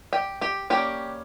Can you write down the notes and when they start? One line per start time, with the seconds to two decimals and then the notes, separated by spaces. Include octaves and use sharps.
0.13 G4 G5
0.41 G4 G5
0.70 G3 A#3 C#4 G4 G5